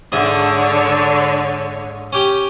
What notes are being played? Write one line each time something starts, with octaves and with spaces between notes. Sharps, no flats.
G#2 D3 G#4 C#5 E5
C#4 G4 G5